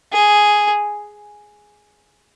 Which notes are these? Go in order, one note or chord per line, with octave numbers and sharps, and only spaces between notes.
G#4